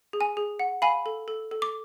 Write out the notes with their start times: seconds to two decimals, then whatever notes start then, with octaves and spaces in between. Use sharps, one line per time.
0.13 G#4
0.21 G#5
0.37 G#4
0.59 F#5
0.82 F5 G#5 B5
1.06 A4
1.28 A4
1.51 A4
1.62 D6